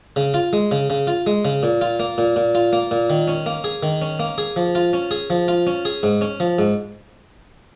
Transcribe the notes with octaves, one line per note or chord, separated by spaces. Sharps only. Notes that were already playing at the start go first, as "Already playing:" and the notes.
C#3
F4
G#3
C#3
C#3
F4
G#3
C#3
A#2
F4
A#3
A#2
A#2
F4
A#3
A#2
D#3
C#4
A#3
G#4
D#3
C#4
A#3
G#4
F3
F4
C#4
G#4
F3
F4
C#4
G#4
G#2
C#4
F3
G#2